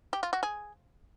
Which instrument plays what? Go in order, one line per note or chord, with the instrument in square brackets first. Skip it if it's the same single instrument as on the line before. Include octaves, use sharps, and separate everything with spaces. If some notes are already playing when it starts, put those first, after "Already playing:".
[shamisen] G4
F4
F#4
G#4